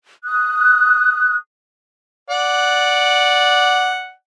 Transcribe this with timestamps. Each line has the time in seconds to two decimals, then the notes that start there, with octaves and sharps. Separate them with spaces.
0.24 D#6 F#6
2.30 D5 F#5